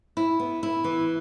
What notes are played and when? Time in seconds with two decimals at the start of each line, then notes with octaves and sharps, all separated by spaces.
0.17 E4
0.40 B3
0.63 E4
0.84 E3